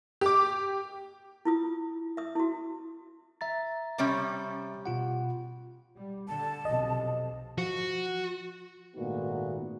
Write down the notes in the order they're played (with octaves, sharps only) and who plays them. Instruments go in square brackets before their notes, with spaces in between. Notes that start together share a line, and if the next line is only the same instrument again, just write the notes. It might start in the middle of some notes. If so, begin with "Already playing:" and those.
[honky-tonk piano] G4 D6
[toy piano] E4 F4 D#6
E5 D#6
E4 F#4
[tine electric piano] E5 A#5 A6
[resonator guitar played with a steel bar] C3 G3 C#4
[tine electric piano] B2 F4 F#5
[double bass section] G3
[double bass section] D3 [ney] A5
[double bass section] B1 F2 C3 [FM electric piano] D#5
[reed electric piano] F3 [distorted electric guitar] F#4
[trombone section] G#1 A#2 A3 B3 D#4 F#4